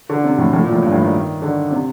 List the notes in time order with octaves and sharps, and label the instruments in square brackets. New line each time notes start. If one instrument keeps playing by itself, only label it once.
[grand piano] D3
C3
A2
A2
A#2
A2
G2
A2
D#3
D3
C3